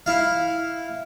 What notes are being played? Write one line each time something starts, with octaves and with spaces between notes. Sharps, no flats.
E4 F5